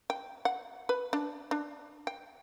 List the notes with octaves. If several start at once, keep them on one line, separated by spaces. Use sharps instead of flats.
G5
F#5
B4
D4
D4
G5